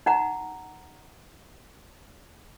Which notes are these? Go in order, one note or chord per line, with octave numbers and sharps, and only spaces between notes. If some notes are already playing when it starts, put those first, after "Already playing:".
D#4 F#5 A#5